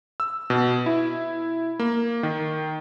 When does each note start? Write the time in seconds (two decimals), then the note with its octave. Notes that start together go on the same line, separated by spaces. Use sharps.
0.20 E6
0.50 B2
0.86 E4
1.79 A#3
2.23 D#3